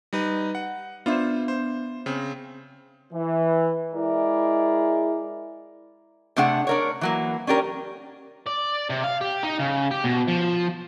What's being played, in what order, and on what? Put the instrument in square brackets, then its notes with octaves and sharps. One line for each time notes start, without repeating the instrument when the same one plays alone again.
[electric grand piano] G3 D#4 B4
F#5
[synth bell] B3 D4 E5 [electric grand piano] F4 C5
[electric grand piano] C5
C#3 C4
[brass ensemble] E3
G#3 E4 G#4 A#4 D5
[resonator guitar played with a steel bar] C3 A3 D4 G#4 F#5
D4 A#4 C#5
E3 F#3 A#3
C#4 D4 G4 A#4
[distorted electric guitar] D5
C3
F5
G4
D#4
C#3
G4
B2
F3